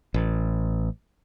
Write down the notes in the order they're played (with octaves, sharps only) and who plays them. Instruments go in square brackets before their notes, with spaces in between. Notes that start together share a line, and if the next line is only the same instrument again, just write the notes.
[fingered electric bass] A1